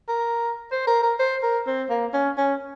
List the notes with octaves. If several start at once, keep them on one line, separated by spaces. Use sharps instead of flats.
A#4
C5
A#4
A#4
C5
A#4
C4
A#3
C#4
C#4